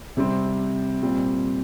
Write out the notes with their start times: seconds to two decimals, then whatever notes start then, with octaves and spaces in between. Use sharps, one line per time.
0.17 C3 G3 C4
1.03 A#2 G3 C4